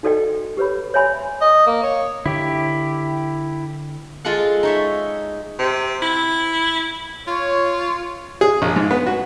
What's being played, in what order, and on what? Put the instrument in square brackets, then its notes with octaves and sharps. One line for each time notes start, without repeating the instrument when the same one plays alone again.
[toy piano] D#4 F#4 A4 D5 D#5 G5
G4 B4 C#5 B5
C#5 D5 E5 G#5 B5 C6
[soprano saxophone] D#5
A#3
C#5
[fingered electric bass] D3 [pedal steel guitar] E4 G4
[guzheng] G#3 F4 G#4 A4 F#5
D#4 C#5 E5
[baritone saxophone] C3
E4
[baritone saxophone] F4 [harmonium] C#5
[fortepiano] G#4
A#1
G#2
B3
F#4